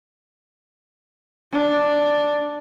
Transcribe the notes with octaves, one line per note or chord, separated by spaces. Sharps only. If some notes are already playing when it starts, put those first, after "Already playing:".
D4